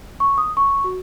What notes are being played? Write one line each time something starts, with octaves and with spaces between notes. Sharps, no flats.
C#6
D#6
C#6
F#4